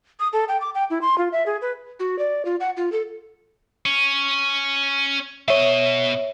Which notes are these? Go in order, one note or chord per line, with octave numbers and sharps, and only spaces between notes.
D#6
A4
G5
D6
G5
E4
C6
F4
E5
G#4
B4
F#4
D5
F4
F#5
F4
A4
C#4
B2 C#5 D#5 E5